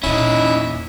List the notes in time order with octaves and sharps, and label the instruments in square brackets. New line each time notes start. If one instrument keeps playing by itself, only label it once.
[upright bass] E2 A#2 [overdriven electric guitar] C#4 D#4 [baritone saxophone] E4